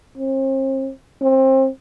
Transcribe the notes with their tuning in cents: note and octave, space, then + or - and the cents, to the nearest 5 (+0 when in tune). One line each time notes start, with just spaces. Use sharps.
C4 +40
C4 +25